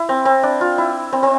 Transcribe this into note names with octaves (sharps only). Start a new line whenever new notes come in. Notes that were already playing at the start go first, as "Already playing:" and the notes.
Already playing: E4
C4
C4
D4
F4
E4
C4
C4